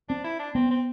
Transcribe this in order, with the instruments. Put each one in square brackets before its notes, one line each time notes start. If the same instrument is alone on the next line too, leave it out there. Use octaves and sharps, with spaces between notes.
[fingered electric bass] C4 [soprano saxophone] D4
[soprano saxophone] E4
D4
[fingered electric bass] B3 [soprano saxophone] C4
[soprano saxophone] C4